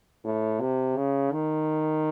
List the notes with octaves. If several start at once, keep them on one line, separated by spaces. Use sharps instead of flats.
A2
C3
C#3
D#3